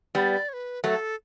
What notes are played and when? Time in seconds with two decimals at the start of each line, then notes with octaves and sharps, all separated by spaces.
0.15 G3 B3 D5
0.49 C#5
0.53 B4
0.84 F#3 A3 B4
0.88 A4